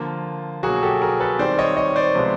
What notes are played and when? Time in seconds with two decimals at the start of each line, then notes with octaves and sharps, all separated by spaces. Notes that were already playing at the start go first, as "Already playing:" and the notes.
Already playing: D3 F3 A#3 F4
0.63 B2 F#3 A#3 F#4 G#4
0.83 G4 A4
1.02 G#4 A#4
1.20 A4 B4
1.39 D#3 G3 C4 C5 D5
1.58 C#5 D#5
1.77 C#5 D#5
1.96 C5 D5
2.15 C3 F3 G#3 B3